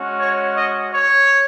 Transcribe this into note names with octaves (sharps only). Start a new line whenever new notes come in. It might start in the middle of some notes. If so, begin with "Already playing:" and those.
Already playing: G#3 C#4 F#4
C#5
D#5
C#5